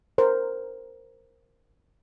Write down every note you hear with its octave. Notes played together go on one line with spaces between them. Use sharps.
A#4 C5